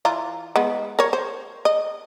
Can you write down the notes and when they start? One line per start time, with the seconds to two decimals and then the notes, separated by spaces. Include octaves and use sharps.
0.05 E3 F4 A#5
0.56 G#3 B3
0.99 A#4 C#5
1.13 C5
1.65 D#5